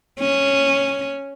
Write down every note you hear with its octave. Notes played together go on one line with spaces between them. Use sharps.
C#4